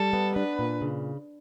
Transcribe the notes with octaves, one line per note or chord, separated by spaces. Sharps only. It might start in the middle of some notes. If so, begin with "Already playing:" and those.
Already playing: G3 A4
B3
D4 B4
A#2
C#3